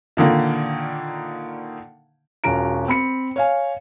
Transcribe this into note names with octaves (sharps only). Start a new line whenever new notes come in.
A#2 D3 D#3 A#3
E1 C#4 F4 F#4 A#5 D7
C4 B5 C#7
C#5 F5 G#5